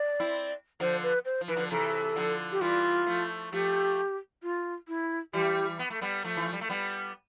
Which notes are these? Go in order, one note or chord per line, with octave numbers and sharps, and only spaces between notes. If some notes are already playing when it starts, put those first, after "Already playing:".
Already playing: D5
C4 E4
D3 F3 C5
B4
C5
F3
E3 B4
D3 F3
C3 E3 A4
D3 F3
G4
E3 G3 F4
F3 A3
F3 A3 G4
F4
E4
E3 G3 G4
B3
A3
G3 B3
F3 A3
E3
F3
G3
A3
G3 B3